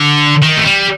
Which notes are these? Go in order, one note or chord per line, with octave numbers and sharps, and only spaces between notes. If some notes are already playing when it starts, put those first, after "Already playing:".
Already playing: D3
D#3
A3
G3